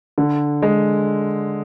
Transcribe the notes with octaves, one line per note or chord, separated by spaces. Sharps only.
D3
G#3